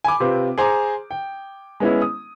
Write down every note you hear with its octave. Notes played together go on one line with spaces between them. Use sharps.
G#5 B5 D6
C3 C4 F4 B4
G#4 C5 A#5 D6
G5
G#3 B3 C#4 E4
D#6